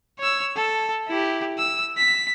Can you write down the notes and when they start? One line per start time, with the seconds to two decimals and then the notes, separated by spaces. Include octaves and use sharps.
0.19 C#5 E6
0.56 A4
1.08 E4 G4
1.58 E6
1.97 B6